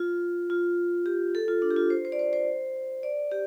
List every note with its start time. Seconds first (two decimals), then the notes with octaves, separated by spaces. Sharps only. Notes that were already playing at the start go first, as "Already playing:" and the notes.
Already playing: F4
0.50 F4
1.06 G4
1.35 A4
1.48 F4
1.62 D4
1.71 G4
1.76 F4
1.90 C5
2.05 C5
2.12 D5
2.19 C5
2.33 C5
3.03 D5
3.31 G4